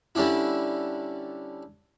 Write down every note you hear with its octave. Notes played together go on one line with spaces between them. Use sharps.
D3 G3 C#4 D4 E4